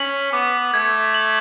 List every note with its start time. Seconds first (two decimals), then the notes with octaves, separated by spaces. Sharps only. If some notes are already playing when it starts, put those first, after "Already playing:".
Already playing: C#4 B6 F#7
0.33 B3 D6
0.74 A3 G#6
1.14 F#7